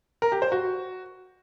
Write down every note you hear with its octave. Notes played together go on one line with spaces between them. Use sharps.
A#4
G4
C5
F#4